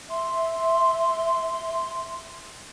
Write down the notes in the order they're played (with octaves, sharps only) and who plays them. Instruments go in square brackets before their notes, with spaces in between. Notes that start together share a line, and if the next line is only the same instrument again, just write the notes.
[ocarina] E5 [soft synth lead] C6